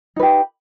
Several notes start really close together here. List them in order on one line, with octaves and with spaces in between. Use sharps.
D#4 B4 G4